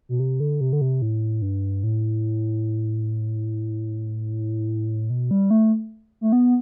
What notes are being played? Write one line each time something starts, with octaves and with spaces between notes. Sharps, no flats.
B2
C3
D3
C3
D3
C3
A2
G2
A2
B2
G3
A3
A3
B3